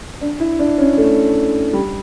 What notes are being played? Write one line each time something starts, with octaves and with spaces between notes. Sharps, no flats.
D4
E4
D4
C#4
A3
G3